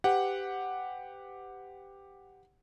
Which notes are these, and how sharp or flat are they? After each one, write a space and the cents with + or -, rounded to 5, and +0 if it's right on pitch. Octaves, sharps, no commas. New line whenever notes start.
G4 +5 B4 +40 F#5 +0